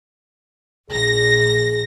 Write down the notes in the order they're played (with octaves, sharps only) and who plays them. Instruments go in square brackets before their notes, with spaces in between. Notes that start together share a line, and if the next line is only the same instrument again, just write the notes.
[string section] A#1 A#6 [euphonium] G#4